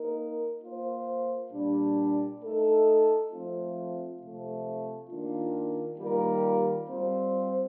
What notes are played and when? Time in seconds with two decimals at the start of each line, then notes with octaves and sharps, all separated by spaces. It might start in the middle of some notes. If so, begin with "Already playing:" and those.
Already playing: A#3 D#4 A#4
0.62 A#3 F4 C5
1.52 A#2 G3 D4
2.41 A3 D#4 A4
3.30 F3 A3 C4 F4
4.19 C3 F3 A3
5.09 D#3 A#3 D4 F4
5.98 D#3 G3 A#3 F4 A#4
6.88 G3 C4 F4 C5